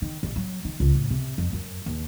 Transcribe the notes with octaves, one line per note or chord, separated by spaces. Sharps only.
D#3
A1
F#3
D#3
C#2
A2
C3
F2
F#2
D#2